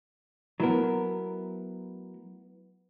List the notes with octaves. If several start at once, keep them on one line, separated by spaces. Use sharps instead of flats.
F#3 A3 B3 E4 A#4